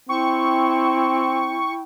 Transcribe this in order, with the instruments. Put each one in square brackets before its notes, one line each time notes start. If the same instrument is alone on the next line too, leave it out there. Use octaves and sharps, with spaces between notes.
[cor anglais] C4 [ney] E4 [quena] G5 [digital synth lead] C#6